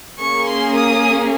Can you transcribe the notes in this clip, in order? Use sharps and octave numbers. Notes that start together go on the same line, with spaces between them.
A#3 C#4 G#4 C#6
C6
D#6